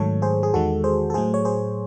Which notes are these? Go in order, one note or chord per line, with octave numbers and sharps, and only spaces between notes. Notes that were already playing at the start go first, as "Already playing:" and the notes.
Already playing: G#2 D#3 F#3 A3 A4 C#5
G#4 C5
G#4
E2 D#3 G#3 F#4 A4
G#4 C5
A4
A2 F#3 A3 G#4 C5
C#5
G#4 C5